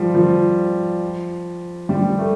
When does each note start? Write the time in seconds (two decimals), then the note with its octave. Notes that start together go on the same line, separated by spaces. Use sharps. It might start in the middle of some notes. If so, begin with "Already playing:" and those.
Already playing: F3 G3
0.14 F3
1.89 G3
2.18 A3